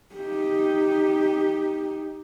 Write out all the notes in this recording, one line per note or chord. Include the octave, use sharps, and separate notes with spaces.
D#4 G4